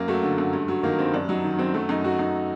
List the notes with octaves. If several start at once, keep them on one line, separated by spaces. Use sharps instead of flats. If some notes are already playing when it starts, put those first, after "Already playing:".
Already playing: F#2 A#3
F#3 A3
D3
F#2
G2
F#3
D#3 A#3
G2 C4
F#2 D4
F#3 D#4
D#3
F#2 C4
F#3 A3
F#2 D#4
F#3 F#4
F#2 D#4